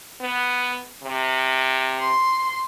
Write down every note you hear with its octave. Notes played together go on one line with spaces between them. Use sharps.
B3
C3
C6